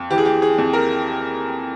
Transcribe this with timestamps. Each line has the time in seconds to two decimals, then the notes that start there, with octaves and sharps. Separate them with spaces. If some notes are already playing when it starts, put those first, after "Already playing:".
Already playing: F2
0.10 E3 G4
0.18 G#4
0.25 G4
0.42 G#4
0.58 F2
0.73 A#4